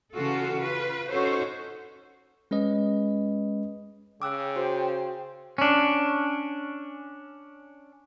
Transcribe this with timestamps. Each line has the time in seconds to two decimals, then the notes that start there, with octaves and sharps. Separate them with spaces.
0.13 C#3 E3 F4 F#4 A4
0.59 F4 B4
1.09 C#4 D#4 F#4 A4 C5 C#5
2.51 G#3 C#4 B4 D#5
4.22 C#3 G5 D6 E6 F#6
4.56 F#4 C5
5.58 C#4 D4